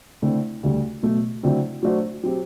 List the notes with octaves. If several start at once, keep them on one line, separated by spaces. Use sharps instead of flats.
D3 A3 C4 E4
D2 D3 G3
B2 F#3 A3
D3 F#3 A3 C4 E4
F#3 A3 D4 F#4 C5
F#3 C4 G4